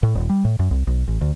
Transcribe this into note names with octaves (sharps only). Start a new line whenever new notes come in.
A2
D#1
G3
A2
F#2
C2
B1
A1
D2